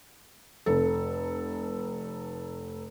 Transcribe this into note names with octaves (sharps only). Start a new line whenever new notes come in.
F1 A4